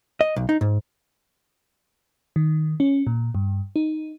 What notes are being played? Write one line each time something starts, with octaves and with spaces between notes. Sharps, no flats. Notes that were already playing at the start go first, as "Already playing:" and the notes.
D#5
B1
D#4
G#2
D#3
C#4
A#2
G2
D#4